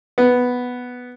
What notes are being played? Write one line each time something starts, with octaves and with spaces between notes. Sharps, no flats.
B3